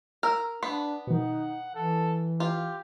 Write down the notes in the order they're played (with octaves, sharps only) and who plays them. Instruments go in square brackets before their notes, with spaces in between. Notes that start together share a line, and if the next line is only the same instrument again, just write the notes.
[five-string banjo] A#4 [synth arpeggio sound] E6
[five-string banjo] B3 [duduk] D4 [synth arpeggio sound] B5
[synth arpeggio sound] B2 D#3 [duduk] D#4 [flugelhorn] F#5
[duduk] E3 [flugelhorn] A4
[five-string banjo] F4 [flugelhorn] G4